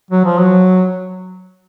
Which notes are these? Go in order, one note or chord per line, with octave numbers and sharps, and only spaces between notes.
F#3
F3
F#3